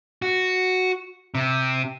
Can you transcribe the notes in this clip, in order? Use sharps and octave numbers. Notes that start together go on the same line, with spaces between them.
F#4
C3